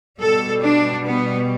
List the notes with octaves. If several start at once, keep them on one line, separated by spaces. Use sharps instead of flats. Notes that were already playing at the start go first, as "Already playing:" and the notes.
B2 G3 A4
D4
B3